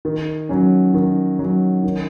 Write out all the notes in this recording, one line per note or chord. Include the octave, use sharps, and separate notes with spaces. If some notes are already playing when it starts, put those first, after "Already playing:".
D#3
F#3 C#4
D#3
F#3 C#4
D#3